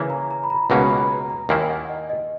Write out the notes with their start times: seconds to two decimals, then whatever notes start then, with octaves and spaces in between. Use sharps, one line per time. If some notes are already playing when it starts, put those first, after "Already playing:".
Already playing: C#3 E3 A#3 C#4 E4
0.10 A#5
0.31 A#5
0.44 B5
0.50 A#5
0.70 C#2 B2 F#3 A#3 C#4 B5
0.90 B5
1.10 A#5
1.30 A#5
1.49 D#2 D#3 A#3 E4 G#5
1.69 F#5
1.89 D#5
2.09 D#5